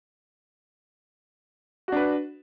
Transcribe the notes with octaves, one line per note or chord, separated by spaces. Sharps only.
D4 F#4 B4